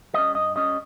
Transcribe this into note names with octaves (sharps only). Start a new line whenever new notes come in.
G3 C#4 D#5
G2 D#5
G3 C#4 D#5